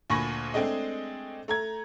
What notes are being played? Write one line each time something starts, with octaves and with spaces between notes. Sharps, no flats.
D2 A#2 G#5 B5 C#6 A#6
G#3 A3 C4 D4 G#4 D#5
A3 A#5 G#6